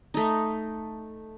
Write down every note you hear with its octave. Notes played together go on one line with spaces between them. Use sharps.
A3 D#4